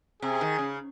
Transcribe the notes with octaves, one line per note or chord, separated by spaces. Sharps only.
C3 G#4
D#3
C#3